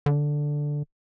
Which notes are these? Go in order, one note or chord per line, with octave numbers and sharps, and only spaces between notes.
D3